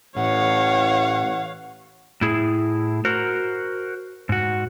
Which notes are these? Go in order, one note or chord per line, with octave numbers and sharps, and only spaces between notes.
A1 A2 C#5 F5 F#5
A2 E4 G#4
F#4 A#4 C5
G#2 F#4